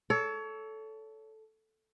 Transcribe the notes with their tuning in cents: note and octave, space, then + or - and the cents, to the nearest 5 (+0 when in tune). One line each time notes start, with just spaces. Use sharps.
A4 -5 C#5 +30